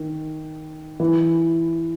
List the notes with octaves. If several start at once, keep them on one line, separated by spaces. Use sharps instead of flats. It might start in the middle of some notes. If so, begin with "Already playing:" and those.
Already playing: D#3
E3